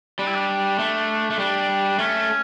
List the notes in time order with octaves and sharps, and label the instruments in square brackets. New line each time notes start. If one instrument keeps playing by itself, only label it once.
[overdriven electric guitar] G3 [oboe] D4
[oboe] E4
D4
[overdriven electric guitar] A3
A3
[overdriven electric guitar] G3 [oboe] D4
[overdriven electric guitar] A3 [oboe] C#4